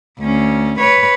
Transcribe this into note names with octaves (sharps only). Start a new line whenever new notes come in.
D2 C#4
B4 C#5